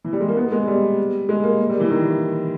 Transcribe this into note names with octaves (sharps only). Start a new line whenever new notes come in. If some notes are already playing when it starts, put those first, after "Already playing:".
E3
G3
G#3
A#3
B3
G#3
G3
G#3
A#3
G3
E3
D#3